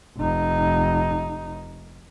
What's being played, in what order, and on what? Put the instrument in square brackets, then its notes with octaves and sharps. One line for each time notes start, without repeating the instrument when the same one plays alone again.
[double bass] F1 D#4